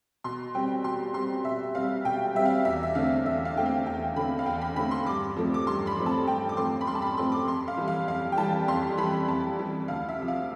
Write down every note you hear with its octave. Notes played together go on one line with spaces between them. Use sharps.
B2 C6
G3 C4 G5
B2 C6
G3 C4 C6
B2 E5
G3 C4 F5
B2 G5
G3 C4 E5
F5
E2 E5
E5
D3 A3 C4 F5
E2 E5
F5
D3 A3 C4 G5
F5
E2 G5
D3 A3 C4 B5
F5
E2 G5
B5
D3 A3 C4 B5
C6
G2 D6
F3 A3 C4
D6
G2 C6
B5
F3 A3 C4
A5
G2 G5
D6
F3 A3 C4 C6
B5
G2 C6
A5
B5
F3 A3 C4 C6
D6
F2 C6
F5
E3 G3
F5
F2 F5
G5
E3 G3 A5
F2 C6
E3 G3 B5
F2 A5
E3 G3
D2 F5
E5
C3 F3
F5